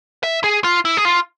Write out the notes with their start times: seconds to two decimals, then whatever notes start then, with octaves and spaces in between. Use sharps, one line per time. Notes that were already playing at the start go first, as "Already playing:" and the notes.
0.23 E5
0.44 G#4
0.64 F4
0.85 E4
0.97 G#4
1.05 F4